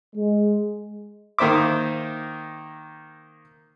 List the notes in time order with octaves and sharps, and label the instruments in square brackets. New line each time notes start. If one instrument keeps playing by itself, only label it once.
[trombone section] G#3
[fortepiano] D#3 A#3 C5 E5 D6